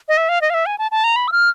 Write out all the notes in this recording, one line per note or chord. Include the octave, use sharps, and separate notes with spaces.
D#5
E5
F5
D#5
F5
E5
G#5
A5
A5
A#5
B5
E6
F6